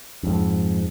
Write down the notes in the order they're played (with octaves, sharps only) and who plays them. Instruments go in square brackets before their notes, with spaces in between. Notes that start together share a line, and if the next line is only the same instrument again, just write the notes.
[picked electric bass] F2 G#2